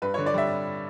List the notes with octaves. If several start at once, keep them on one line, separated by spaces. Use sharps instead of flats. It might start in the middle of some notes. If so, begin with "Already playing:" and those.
G2 B4
C#5
D3
D5
G3 E5